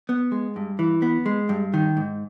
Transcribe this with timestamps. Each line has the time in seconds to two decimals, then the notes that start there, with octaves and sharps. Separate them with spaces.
0.09 B3
0.32 G#3
0.56 G2
0.79 E3
1.02 B3
1.26 G#3
1.49 G2
1.74 D#3
1.97 G#2